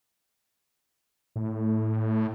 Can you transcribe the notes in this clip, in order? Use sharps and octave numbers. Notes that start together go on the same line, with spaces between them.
A2